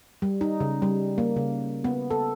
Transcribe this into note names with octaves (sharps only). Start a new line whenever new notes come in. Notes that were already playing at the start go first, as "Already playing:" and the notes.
G3
D#4
C#3
G3
A#3
C#3
B3
A4